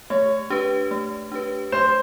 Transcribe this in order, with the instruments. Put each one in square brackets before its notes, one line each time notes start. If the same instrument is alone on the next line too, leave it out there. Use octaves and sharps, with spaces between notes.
[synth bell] A3 [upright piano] C#5
[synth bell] D4 G4 B4
A3
D4 G4 B4
[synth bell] A3 [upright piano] C5